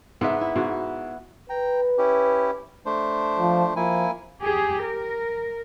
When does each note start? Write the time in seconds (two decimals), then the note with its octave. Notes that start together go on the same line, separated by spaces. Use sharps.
0.21 G#2 B3 E5
0.41 E4
0.56 G#2 F#4
1.50 B4 G5 A#5
1.98 C#4 E4 G4
2.86 A3 D4 C5
3.38 F3
3.76 F3 A#3 E4 G#5
4.40 G4 G#4
4.83 A#4